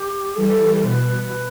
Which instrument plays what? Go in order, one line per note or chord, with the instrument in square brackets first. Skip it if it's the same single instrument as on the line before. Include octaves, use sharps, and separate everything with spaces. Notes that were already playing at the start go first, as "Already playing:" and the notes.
Already playing: [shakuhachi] G4
[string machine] E3 G3 [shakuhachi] A4
[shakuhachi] A4
[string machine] B2 [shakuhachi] C5
[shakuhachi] B4